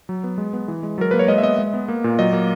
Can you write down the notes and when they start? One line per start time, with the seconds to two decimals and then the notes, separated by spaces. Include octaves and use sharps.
0.09 F#3
0.24 B3
0.38 G#3
0.53 B3
0.68 E3
0.83 G#3
0.98 F#3 A#4
1.11 A#3 B4
1.19 C#5
1.28 G#3 D#5
1.38 E5
1.43 B3 D#5
1.59 G#3
1.73 B3
1.88 A#3
2.04 A#2
2.19 F#3 D#5
2.33 A#3